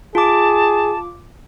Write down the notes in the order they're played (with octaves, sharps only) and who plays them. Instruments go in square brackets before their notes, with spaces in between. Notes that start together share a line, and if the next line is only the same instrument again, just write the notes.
[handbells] F4 D6 [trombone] G#4 [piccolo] A5